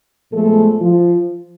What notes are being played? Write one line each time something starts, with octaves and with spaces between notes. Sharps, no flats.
A#2 F3 G#3 A3 B3 A4
F3 F4